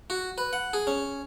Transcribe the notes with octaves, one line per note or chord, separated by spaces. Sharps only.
F#4
B4
F#5
G#4
C#4